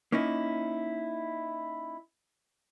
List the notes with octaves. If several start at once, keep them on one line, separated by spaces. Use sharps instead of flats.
A#3 C#4 D#4 E4